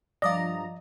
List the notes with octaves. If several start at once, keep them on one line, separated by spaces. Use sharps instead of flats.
G2 F3 D5 D#5 F5 A#5 D#6 A#6